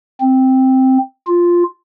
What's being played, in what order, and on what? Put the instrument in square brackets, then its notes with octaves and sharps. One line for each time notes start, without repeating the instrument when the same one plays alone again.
[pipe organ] C4
F4